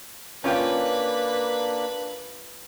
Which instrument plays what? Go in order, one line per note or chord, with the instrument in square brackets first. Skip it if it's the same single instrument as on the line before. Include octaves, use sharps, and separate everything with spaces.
[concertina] A#3 D4 [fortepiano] C#4 F4 G5 [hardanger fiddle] B4